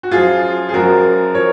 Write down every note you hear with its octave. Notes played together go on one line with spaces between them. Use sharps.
F#4
F#2 F3 F4 G#4
G#4
F#2 F3 F#4 A#4
F3 A#4 C#5